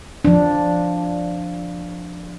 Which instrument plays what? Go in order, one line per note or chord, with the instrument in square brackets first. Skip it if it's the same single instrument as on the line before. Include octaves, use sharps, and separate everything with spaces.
[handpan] F3 D4